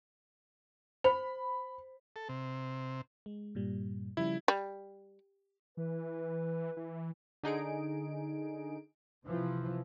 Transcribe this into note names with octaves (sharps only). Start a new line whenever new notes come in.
C5 B5
A4
C3
G#3
G2 A#2 G3
C#3 F3 G3 E4
G3
E3 B4
E3
D3 D#4 G#4 D7
C3 E3 F3